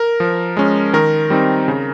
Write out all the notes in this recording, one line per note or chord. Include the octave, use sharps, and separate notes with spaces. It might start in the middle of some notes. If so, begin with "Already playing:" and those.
Already playing: A#4
F3
G#3 C#4
D#3 A#4
G3 C4 D#4
C#3